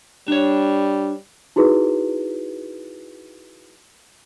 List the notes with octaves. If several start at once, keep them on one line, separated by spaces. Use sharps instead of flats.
G3 D4 C#5
D#4 E4 F#4 G#4 B4